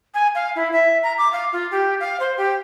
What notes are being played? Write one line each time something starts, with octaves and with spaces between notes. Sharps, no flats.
G#5
F5
E4
E5
A#5
D6
F5
F4
G4
F5
C5
G4